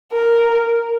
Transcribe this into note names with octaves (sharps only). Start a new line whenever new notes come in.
A#4